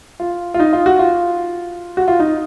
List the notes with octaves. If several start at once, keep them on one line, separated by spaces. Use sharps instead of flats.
F4
F4
D#4
F4
F#4
F4
F#4
F4
D#4